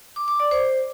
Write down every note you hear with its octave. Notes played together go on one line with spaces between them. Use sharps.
D6
D6
D5
C5